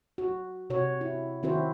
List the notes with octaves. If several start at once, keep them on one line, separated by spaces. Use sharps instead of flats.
F#4
C3 F#4 C#5
E4
D#3 C4 E4 F#4 C5